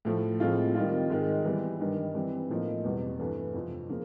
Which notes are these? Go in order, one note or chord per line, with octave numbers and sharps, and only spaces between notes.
A2 F3 A3
A2 F3 G#3 C4 F4
D#3 G3 C4 F4
G#2 D#3 G#3
E3 G3 B3
G2 D#3 G3
E3 G3 C4
A2 F3 A#3 D#4
E2 B2 G3 C4
G2 E3 A3 D4
F2 C3 F3
C#3 F3 A#3